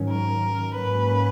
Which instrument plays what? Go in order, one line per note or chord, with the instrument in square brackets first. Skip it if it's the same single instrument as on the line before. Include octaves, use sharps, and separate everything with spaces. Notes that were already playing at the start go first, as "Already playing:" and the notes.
Already playing: [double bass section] G#2 D#3 F#3 C#4
[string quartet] A#4
[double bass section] G#2 F#3 A#3 C#4 [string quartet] B4